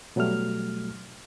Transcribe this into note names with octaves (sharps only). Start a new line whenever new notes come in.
B2 F#3 G3 A3 F6